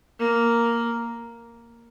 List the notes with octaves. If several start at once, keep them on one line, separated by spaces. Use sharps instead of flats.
A#3